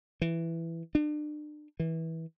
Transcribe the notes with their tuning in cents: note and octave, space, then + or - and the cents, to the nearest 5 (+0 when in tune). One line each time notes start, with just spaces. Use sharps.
E3 +10
D4 +35
E3 -20